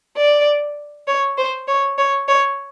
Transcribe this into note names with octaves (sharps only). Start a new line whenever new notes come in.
D5
C#5
C5
C#5
C#5
C#5